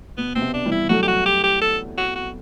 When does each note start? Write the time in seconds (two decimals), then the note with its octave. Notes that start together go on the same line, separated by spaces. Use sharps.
0.18 B2 B3
0.35 B2 C4
0.41 C3
0.54 D4
0.66 E3 G3
0.72 E4
0.89 F#3 A3 F#4
1.03 G4
1.08 F#4
1.26 G4
1.44 G4
1.62 A4
1.98 F#4
2.16 F#4